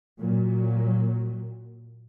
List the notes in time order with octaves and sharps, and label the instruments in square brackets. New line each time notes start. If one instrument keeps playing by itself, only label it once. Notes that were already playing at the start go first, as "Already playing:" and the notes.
[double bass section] A#2 F#3